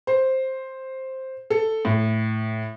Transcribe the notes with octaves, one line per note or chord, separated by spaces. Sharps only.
C5
A4
A2